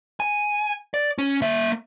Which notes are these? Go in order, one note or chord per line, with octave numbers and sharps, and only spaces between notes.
G#5
D5
C#4
A#3 E5